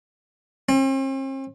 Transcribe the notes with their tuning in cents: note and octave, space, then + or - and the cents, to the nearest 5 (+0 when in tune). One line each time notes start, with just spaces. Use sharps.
C4 +45